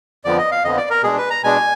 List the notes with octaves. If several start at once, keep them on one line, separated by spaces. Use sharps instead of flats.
F2 D3 F3 B3 D5
D#5
F5
F2 D3 F3 B3 D#5
D5
A#4
B2 G#3 D4 G#4
B4
A#5
B2 G#3 D4 G#5